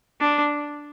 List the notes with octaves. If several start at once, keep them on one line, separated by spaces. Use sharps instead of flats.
D4